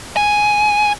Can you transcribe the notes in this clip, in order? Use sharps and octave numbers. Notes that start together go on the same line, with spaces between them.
G#5